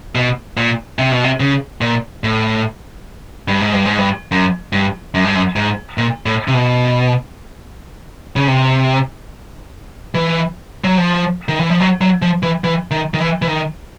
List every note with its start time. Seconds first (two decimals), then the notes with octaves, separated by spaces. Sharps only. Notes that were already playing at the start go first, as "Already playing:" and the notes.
0.15 B2
0.57 A#2
0.99 C3
1.12 B2
1.24 C3
1.40 C#3
1.81 A#2
2.24 A2
3.48 G2
3.61 G#2
3.73 G2
3.85 G#2
3.98 G2
4.32 F#2
4.73 G2
5.14 F#2
5.25 G2
5.35 F#2
5.56 G#2
5.98 A#2
6.26 A2
6.48 C3
6.54 B2
8.36 C#3
8.48 C3
10.15 E3
10.84 F#3
10.98 F3
11.49 D#3
11.60 E3
11.70 F3
11.80 F#3
12.01 F#3
12.22 F3
12.43 E3
12.64 E3
12.91 D#3
13.14 D#3
13.19 E3
13.42 E3
13.47 D#3